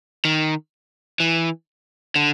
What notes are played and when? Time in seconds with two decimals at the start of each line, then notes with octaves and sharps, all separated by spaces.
0.25 D#3
1.20 E3
2.16 D3